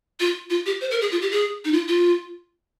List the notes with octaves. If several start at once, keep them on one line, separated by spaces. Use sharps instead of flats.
F4
F4
G4
C5
A#4
G#4
F4
G4
G#4
D#4
F4
F4